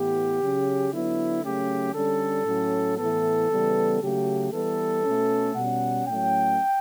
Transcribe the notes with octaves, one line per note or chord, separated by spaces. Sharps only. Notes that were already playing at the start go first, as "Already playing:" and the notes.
Already playing: A2 E3 B3 G4
C#3 F#3 C#4
D3 F#3 B3 E4
C#3 F#3 A3 C#4 G4
D3 G3 C#4 A4
A2 F#3 C#4
A2 E3 B3 A4
C#3 E3 G3 B3
C#3 F#3 A3 G4
E3 G3 B3 A4
B2 A3 C#4
B2 G3 C#4 F#5
A2 F#3 A3 C#4 G5